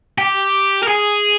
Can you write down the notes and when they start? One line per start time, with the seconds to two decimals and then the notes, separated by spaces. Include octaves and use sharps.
0.18 G4
0.83 A#4
0.88 G#4